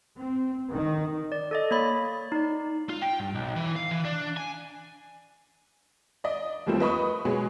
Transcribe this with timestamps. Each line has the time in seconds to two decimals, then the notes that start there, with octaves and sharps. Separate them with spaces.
0.18 C4
0.72 D#3
1.32 D5
1.51 A4 D5 D#5
1.71 A#3 C#5 B5 A6
2.32 D#4 D5
2.90 F4
3.02 G5
3.20 G2
3.35 B1
3.56 E3
3.76 F5
3.91 E3
4.05 D4
4.37 G#5
6.24 D5 D#5
6.67 D#2 F3 G3 A3 A#3 C4
6.80 B4 D#5 B5 C#6 D#6
7.25 B2 F#3 G#3 B3 G#4